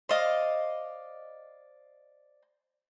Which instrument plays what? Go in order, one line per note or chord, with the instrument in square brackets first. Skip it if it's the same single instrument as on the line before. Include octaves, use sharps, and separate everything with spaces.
[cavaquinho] C5 D5 D#5 F5